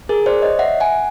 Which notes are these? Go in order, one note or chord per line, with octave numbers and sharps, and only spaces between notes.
G#4 A#4
C5 D5
C#5 D#5
E5 F#5
F#5 G#5